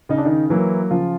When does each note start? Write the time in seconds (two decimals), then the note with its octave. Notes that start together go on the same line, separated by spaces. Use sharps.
0.09 C#3 D#4
0.18 D4
0.25 D#3 D#4
0.50 E3 F#3 A#3 E4
0.91 C#3 F3 F4